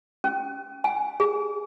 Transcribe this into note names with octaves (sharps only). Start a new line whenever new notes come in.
C#4
G#5
G#4